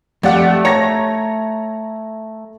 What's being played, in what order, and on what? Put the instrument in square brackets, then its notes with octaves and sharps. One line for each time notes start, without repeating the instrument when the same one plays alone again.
[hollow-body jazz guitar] F2 [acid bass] A3 [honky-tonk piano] G4 D5 F#5
[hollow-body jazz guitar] C#5 [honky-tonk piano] A#5 G#6 A#6